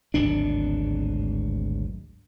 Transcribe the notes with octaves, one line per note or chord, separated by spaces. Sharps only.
D1 G#1 B2 D4